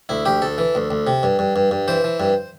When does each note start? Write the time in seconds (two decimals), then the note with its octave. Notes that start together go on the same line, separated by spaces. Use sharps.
0.09 D2 E4
0.25 D2 G4
0.42 D2 A4
0.58 E3
0.75 D2
0.91 D2
1.07 C3
1.23 G2
1.39 G2
1.56 G2
1.71 G2
1.88 E3 C5
2.04 E3
2.20 G2